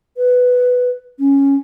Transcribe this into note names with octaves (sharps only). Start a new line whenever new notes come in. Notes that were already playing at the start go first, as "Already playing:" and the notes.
B4
C#4